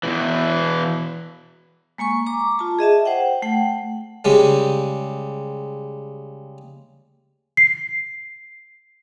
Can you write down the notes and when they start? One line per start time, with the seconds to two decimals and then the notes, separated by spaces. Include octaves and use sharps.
0.03 E2 G2 B2 E3
1.98 G#3 A#3 G#5 C#6
2.26 A#5 D6
2.59 F4 A5
2.79 G#4 D#5 E5 A5
3.05 C5 F#5 G5
3.42 A3 F#5 G5
4.25 C#3 G3 G#3
7.57 C7